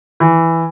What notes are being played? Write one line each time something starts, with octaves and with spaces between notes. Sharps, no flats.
E3